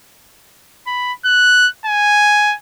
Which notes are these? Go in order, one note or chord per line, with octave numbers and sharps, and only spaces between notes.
B5
F#6
G#5